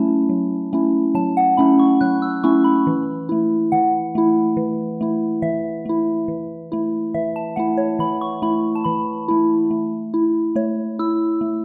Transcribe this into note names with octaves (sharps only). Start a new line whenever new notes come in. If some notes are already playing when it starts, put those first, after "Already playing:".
Already playing: F#3 A3 C#4 E4 A5
F#3
A3 C#4 E4
F#3 A5
F#5
A3 C#4 E4 B5
C#6
F#3 F#6
E6
A3 C#4 E4 C#6
B5
E3
A3 E4
E3 F#5
A3 E4
E3
A3 E4
E3 E5
A3 E4
E3
A3 E4
E3 E5
A5
A3 E4 F#5
C#5
E3 B5
C#6
A3 E4 B5
A5
E3 B5
A3 E4
A3
E4
A3 C#5
E4 E6
A3